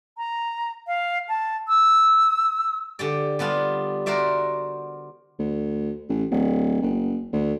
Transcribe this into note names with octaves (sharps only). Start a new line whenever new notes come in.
A#5
F5
A5
E6
D3 G4 D5
G3 B3 D4 F4
F#4 A#4 C5 D5 E5
D2
A1
D1
F#1
D2